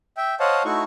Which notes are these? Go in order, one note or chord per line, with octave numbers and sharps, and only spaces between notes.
E5 G5
C5 C#5 D#5 F5 F#5 A5
A3 D#4 E4 F#4 C#6